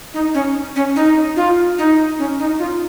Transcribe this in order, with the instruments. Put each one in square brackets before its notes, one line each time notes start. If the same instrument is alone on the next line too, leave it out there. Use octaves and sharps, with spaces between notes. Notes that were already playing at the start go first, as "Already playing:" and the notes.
[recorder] D#4
C#4
C#4
D#4
F4
D#4
C#4
D#4
F4